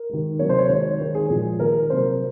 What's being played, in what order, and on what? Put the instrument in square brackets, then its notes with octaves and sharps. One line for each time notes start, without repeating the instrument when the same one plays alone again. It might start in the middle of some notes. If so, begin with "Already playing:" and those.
Already playing: [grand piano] A#4
D#3 G#3
C3 F#3 A#3 C#5
C5
C#5
D#3 G#3 C#5
D#3 G#3
G#4
A#2 F3 G#3 G#4
D#3 A#3 A#4
C3 F#3 A#3 C5